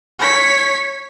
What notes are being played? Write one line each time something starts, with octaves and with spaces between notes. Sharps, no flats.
C#5 B6